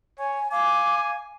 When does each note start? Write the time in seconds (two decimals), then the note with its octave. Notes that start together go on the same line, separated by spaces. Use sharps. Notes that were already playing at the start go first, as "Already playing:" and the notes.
0.19 C#5 G#5
0.52 F5 G#5 D6